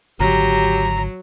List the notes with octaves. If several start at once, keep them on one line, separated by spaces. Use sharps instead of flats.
G#1 D3 F#3 G4 A#5